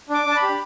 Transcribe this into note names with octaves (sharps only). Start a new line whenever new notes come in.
D4 D6
D4
A5
B5
G4